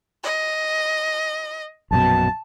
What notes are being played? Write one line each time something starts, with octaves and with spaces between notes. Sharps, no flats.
D#5
A#1 F#2 B2 A5